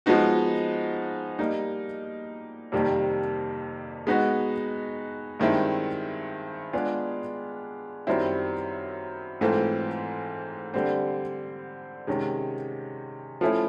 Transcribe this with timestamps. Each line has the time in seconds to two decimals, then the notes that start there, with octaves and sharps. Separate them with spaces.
0.06 F3 G#3 B3 D#4 F#4
1.39 G3 A#3 D#4
2.72 F2 C3 D#3 G3 A#3
4.07 G#3 B3 D#4 F#4
5.40 G2 D#3 G#3 C4 E4
6.73 G#3 B3 D4 F4 G#4
8.07 F#2 D#3 G3 C4 E4
9.41 G#2 E3 A3 C4 F4
10.74 D3 G3 C4
12.07 C3 D#3 G#3 C#4
13.41 F3 A3 C#4 E4